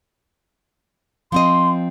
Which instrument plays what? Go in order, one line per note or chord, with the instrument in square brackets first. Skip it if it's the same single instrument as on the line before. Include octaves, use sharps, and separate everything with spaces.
[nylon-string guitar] F3 C4 D#5 [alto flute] C6